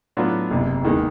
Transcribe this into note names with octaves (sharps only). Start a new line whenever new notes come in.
A2 F#3 B3 D4 F4
F#1 E2 C3
D#2 D#3 G#3 B3 D#4